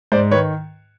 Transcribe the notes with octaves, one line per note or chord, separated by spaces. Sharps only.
G#2 C5 D5
D#3 B4 C#5